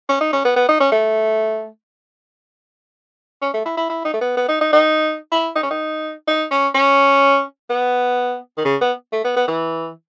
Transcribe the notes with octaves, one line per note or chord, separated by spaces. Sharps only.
C#4
D#4
C#4
B3
B3
D#4
C#4
A3
C#4
A3
E4
E4
E4
D#4
A3
B3
B3
D#4
D#4
D#4
E4
D#4
C#4
D#4
D#4
C#4
C#4
B3
D#3
C#3
B3
A3
B3
B3
E3